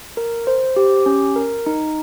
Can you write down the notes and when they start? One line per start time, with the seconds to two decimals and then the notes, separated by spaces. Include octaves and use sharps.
0.17 A#4
0.47 C5
0.76 G4
1.06 C#4
1.36 A#4
1.66 D#4